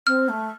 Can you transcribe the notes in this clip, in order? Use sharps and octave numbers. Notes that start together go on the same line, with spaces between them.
C4 F6
A3